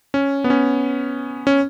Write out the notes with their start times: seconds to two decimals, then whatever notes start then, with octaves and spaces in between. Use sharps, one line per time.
0.14 C#4
0.44 B3
0.50 C#4
1.47 C#4